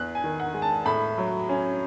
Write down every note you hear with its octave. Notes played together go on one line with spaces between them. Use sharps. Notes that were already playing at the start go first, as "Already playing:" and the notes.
Already playing: E2 F#6
G#5
D#3
F#5
G#3
A5
A2 B5
F#3
C#4